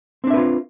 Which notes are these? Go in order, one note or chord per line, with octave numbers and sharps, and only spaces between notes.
C4 D4 F4 B4 E5